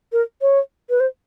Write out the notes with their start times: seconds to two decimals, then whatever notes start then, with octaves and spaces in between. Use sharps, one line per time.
0.12 A#4
0.41 C#5
0.90 B4
1.00 C5